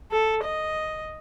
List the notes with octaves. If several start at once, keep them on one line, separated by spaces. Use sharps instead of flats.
A4
D#5